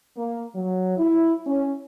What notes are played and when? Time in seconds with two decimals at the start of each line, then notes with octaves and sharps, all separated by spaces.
0.17 A#3
0.54 F#3
0.97 E4
1.46 C#4